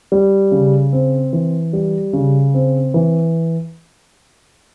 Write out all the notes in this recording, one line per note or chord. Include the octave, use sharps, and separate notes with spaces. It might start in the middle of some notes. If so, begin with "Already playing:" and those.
G3
C#3
C4
E3
G3
C#3
C4
E3